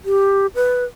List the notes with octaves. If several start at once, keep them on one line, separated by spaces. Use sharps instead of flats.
G4
B4